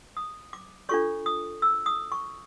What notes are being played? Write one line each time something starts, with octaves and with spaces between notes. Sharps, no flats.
D#6
D6
D4 F4 A4 C#5 C#6
D#6
E6
D#6
C#6